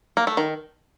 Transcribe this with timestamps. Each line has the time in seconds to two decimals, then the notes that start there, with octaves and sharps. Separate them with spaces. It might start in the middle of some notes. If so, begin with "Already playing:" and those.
0.17 A#3
0.27 A3
0.37 D#3